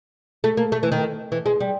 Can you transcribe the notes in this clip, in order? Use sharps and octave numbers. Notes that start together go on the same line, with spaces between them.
A3
A#3
A3
E3
D#3
E3
G#3
G3